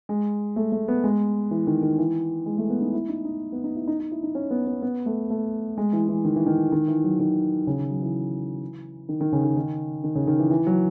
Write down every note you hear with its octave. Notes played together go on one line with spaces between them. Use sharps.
G#3
A3
A3
B3
G#3
E3
D#3
D#3
E3
G#3
A3
B3
D#4
E4
D#4
D#4
B3
D#4
E4
D#4
D#4
E4
D#4
C#4
B3
B3
B3
A3
A3
G#3
E3
E3
D#3
E3
D#3
D#3
E3
F#3
D#3
C#3
D#3
F#3
E3
D#3
D#3
C#3
D#3
D#3
D#3
C#3
D#3
E3
E3
F#3